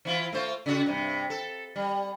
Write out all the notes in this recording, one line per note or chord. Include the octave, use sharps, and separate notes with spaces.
E3 E4 F4
A3 F4 C5
C#3 F#4
G2 C3
A4
G3